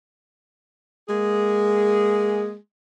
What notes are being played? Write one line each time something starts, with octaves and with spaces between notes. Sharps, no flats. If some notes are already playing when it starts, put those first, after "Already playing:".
G#3 A#3 G#4